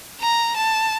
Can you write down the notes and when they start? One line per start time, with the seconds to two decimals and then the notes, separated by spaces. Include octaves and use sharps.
0.21 A#5
0.56 A5